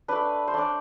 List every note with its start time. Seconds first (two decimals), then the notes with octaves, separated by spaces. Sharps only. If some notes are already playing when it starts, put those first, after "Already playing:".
0.08 A3 D4 B4
0.48 C5
0.54 A3 D4 D5